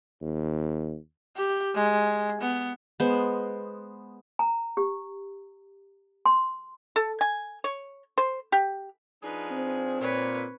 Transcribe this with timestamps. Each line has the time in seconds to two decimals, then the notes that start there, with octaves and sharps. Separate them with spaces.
0.22 D#2
1.36 G4
1.75 G#3
2.41 B3
3.00 G#3 B3 C5
4.39 A#5
4.77 G4
6.26 C6
6.96 A4
7.21 G#5
7.64 C#5
8.18 C5
8.52 G4
9.22 F3 D4 D#4 G#4 B4
9.51 C4
10.00 A#2 B4 C#5